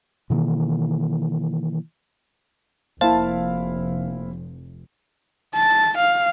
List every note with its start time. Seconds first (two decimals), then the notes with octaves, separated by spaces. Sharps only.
0.30 B2 D#3 E3 A#3
3.01 F1 A#3 E4 C5 F5 A5
5.54 A5
5.97 F5